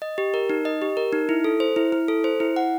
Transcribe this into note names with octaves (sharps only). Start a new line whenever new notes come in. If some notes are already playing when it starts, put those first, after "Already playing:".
D#5
G4
A#4
D#4
D#5
G4
A#4
D#4
E4
A4
C5
E4
E4
A4
C5
E4
F#5